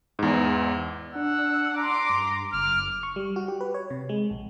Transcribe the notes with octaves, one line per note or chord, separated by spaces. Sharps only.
E2 G#2
D4 F#5 E6
A#5 C6 D6
G2
F#1 D6 F6
C#6
G3
F#4
G4
B4
C#5
C3
G#3
A#1